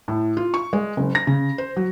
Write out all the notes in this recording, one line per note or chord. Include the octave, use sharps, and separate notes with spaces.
A2
F4
C#6
G#3
F#1
A#6
C#3
C5
F#3